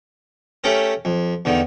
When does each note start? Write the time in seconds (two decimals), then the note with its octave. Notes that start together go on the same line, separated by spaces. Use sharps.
0.64 A3 C#4 G4 A4 A#4
1.05 F2
1.45 E2 D3 D#3